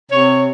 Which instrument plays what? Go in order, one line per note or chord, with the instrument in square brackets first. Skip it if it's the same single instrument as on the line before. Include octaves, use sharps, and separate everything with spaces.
[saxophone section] C3 C#5